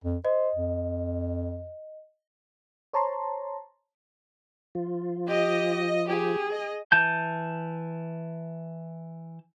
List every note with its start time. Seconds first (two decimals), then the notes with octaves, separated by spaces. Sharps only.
0.04 F2
0.25 C5 D#5
0.55 F2
2.93 C5 C#5 A5 A#5 C6
4.75 F3 F4
5.28 G4 D#5
6.10 G4 G#4
6.52 D#5
6.92 E3 A5 G6